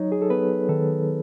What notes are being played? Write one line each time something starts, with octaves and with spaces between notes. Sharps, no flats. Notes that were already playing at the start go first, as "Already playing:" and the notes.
Already playing: F#3 D#4 C#5
G#4
A4
B3 B4
D#3 A4